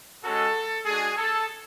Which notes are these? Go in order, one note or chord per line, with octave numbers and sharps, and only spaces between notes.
G#3 C#4 F#4 A4
G#3 D4 F#4 G#4
A4